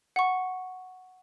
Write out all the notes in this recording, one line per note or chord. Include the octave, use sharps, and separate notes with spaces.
F#5 C#6